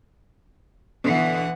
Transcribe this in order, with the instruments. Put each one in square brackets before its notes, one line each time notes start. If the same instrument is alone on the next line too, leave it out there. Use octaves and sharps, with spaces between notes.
[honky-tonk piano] B2 D3 [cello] E3 F#5